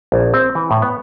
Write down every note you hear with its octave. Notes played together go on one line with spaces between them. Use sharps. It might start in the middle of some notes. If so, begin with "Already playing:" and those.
A#1
C4
E3
A2
B3